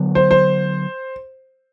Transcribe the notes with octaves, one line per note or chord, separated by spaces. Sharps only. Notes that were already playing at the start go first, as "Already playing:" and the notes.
Already playing: D3 F#3 B3
C5
C5